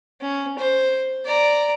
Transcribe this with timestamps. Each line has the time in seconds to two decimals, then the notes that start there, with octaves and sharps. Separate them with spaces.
0.21 C#4
0.59 C5
1.26 D5 A#5